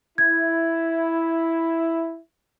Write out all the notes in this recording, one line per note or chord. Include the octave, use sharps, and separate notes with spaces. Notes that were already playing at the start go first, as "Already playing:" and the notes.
E4 G#6